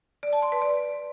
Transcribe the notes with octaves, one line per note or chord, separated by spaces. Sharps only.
D5
A5
C6
B4
D5